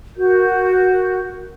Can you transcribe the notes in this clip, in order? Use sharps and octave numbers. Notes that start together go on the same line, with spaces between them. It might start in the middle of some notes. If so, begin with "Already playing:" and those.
F#4 A#4 G6